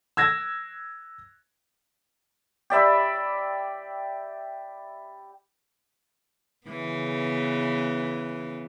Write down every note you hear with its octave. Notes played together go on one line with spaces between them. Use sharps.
E6 G#6 A#6
G4 D5 E5 B5
C#3 E3 B3